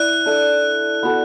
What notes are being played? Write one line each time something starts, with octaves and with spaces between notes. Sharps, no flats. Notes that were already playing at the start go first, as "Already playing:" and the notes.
Already playing: E4 D5 F#6
D4 A4 E5
B3 F#4 A4